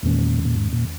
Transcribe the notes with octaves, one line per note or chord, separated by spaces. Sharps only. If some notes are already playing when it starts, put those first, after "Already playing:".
E2 A#2 D#3 G#3 C#4
A#2
G#2
A#2